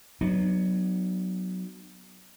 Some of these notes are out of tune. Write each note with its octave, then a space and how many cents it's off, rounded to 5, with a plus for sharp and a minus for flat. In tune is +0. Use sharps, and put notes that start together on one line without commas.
F#3 +0 B3 +0 D4 +45